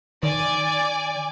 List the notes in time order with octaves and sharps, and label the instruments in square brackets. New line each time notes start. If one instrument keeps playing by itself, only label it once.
[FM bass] D#3 [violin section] D5 G#5